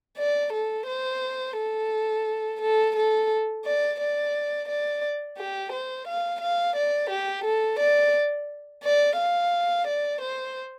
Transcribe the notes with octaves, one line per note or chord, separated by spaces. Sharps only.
D5
A4
C5
A4
A4
A4
D5
D5
D5
G4
C5
F5
F5
D5
G4
A4
D5
D5
F5
D5
C5